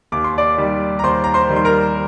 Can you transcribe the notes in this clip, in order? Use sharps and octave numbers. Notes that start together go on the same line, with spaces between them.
D#2 D6
C6
D5 D6
D#3 G3
A#5
D#2 C5 C6
A#5
C5 C6
D#3 G3
C6
A#4 A#5